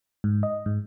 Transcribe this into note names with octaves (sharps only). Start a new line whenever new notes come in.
G#2
D#5
G#2